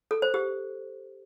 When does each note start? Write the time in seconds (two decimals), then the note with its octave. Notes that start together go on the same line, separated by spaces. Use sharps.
0.11 A4
0.22 C5
0.34 G4